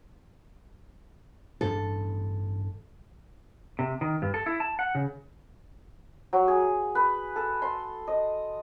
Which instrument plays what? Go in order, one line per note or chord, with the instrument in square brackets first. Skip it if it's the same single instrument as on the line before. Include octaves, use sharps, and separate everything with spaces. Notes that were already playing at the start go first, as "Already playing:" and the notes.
[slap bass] A1 G2 D4 [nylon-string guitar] A4
[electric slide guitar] C3
D#3
G2
A4
E4
A5
F#5
C#3
[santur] F#3
G#4
B4
A4
C6
D#5